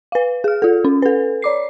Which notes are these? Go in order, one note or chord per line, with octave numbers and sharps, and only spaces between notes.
B4 F5
G#4 F6
F4 A4
C#4
A4 B4
C#5 D5 D6 C7